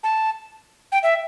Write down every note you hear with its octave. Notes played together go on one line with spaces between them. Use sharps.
A5
G5
E5